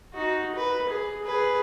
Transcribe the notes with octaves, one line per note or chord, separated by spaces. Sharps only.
D#4 F#4
B4
G#4
G#4 B4